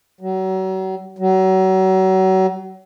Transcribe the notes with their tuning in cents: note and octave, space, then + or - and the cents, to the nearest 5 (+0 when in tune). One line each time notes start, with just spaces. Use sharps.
F#3 +35
F#3 +35